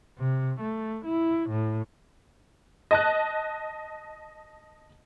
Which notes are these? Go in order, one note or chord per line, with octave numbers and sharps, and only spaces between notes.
C3
A3
E4
A2
D#5 A5 F#6